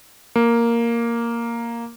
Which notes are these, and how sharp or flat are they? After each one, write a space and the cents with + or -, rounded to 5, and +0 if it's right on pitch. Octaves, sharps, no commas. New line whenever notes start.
A#3 +0